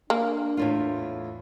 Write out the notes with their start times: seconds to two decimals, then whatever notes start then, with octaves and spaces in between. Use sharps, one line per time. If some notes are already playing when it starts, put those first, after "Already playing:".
0.10 A#3 D4
0.57 E2 A2 F4